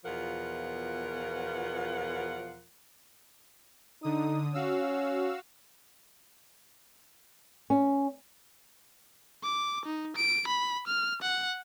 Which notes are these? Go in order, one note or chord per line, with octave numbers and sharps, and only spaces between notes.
E2 B2 F3 F4 A#4 F#5
D3 D#4 D#6
C#4 F#4 F5 E6
C#4
D6
D#4
D7
B5
F6
F#5